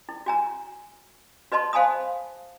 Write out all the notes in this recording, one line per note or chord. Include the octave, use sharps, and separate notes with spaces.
E4
F#4 G#5 A#5
F#4 B4 D#5 A5 C6
C5 F5 G#5 A5 B5 D#6